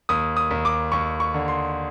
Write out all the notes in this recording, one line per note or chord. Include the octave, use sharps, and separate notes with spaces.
D#2 D#6
D#6
D#2
D6
D#2 C#6
C#6
D3
C6